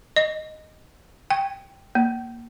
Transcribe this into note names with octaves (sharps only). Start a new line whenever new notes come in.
D#5
G5
A#3